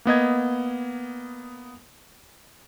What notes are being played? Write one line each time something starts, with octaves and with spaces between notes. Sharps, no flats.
A#3 B3 D#5 G#6